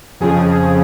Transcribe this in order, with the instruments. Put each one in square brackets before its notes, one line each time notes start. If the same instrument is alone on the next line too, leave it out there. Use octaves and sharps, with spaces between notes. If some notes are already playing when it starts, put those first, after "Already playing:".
[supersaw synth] F2 C#3 F3 G#4